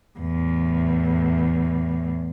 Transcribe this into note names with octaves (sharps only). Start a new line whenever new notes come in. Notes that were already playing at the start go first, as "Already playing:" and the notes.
E2 A2